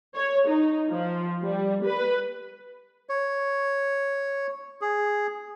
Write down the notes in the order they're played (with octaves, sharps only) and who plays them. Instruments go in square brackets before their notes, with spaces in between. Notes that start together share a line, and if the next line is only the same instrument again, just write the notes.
[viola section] C#5
D#4
F3
G3
B4
[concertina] C#5
G#4